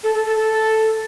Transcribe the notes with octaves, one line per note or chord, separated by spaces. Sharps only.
A4
A4
A4
A4